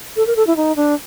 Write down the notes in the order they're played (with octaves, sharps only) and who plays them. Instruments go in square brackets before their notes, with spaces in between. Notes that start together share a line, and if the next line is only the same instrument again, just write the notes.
[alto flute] A4
A#4
A4
E4
D#4
D4